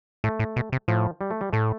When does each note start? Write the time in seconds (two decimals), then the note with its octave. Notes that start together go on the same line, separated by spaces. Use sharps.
0.24 A2 A3
0.39 A2
0.56 B2
0.72 C3
0.88 A2 F3
1.21 G3
1.31 A3
1.41 G3
1.53 A2 A3